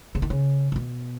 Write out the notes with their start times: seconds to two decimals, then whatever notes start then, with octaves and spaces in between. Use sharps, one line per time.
0.15 C#3
0.22 D#3
0.30 C#3
0.72 C#3
0.76 B2